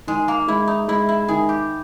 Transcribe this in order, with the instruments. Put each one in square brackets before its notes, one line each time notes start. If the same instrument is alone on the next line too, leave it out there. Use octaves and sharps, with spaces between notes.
[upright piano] D#3 [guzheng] G#3
[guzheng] A#3
[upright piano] G#3 [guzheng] E4
[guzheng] D#4
[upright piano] G#3 [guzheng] E4
[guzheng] E4
[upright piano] D#3 [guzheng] G#4
[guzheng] G4